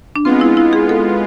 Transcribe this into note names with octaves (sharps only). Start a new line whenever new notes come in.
D4
G#3 B3 C4 F4
E4
E4
G#4
A4